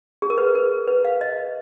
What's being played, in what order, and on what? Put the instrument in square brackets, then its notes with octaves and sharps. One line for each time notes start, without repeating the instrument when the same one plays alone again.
[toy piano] G#4
A#4
B4
A#4
B4
F5
D#5